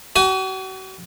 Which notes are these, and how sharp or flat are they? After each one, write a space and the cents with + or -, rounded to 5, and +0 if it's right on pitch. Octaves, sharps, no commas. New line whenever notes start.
F#4 +40 G#5 +0